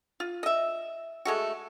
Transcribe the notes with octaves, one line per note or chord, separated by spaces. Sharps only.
F4
D#5 E5
G#3 A3 F#4